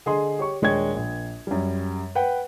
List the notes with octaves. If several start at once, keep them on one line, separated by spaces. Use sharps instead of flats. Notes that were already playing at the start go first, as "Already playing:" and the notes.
D3 G#4 D#5 C6
G4 C#5 C#6
D#1 G#3 D4 C#5 G5 G#6
A#1
F#2 G3
B4 F#5 G5